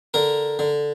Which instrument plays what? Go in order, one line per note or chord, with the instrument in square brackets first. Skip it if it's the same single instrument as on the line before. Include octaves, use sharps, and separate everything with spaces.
[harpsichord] D3 A#4
D3